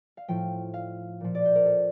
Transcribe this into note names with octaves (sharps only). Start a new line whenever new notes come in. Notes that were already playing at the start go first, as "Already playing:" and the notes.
F5
A2 F3 G5
F5
A#2 F3
D5
C5
A#4
A4